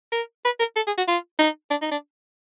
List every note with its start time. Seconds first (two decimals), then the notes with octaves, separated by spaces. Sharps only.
0.12 A#4
0.45 B4
0.59 A#4
0.76 A4
0.87 G#4
0.98 F#4
1.08 F4
1.39 D#4
1.70 D4
1.82 D#4
1.91 D4